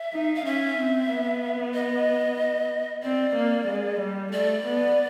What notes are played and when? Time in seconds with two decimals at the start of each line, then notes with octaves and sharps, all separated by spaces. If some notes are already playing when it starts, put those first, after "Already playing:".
Already playing: E5
0.13 D#4
0.35 F5
0.45 C#4 E5
0.77 C4
1.09 B3
1.74 D#5
3.03 C4 D5
3.35 A#3
3.68 G#3
4.00 G3
4.32 A3 D5
4.64 B3